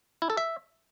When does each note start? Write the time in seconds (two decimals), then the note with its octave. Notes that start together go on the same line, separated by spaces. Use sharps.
0.22 E4
0.30 A4
0.37 E5